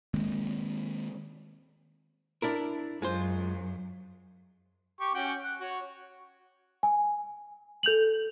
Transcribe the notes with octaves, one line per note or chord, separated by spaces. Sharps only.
D#3 G#3 A#3 C4
D4 E4 A#4
F#2 G#3 F4 C5
G4 C#6
C#4 F#4 G5
F#5
F#4 C#5
G#5
A4 G6 F7 F#7